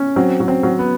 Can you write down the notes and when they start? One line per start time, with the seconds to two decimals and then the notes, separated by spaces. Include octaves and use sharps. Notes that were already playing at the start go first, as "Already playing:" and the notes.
Already playing: C#4
0.16 F#3 C4
0.40 F#3
0.48 C4
0.63 F#3
0.79 B3